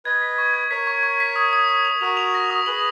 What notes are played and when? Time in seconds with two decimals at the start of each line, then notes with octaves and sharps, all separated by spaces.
0.05 B4 D#5 G#6
0.22 B6
0.38 C#6
0.54 G#6
0.71 A#4 C#5 B6
0.87 C#6
1.03 C#6
1.20 B6
1.36 D#6
1.53 D#6
1.69 D#6
1.85 F7
2.01 F#4 A#4 F7
2.17 F7
2.34 A#6
2.50 D#6
2.66 G#4 B4 F#7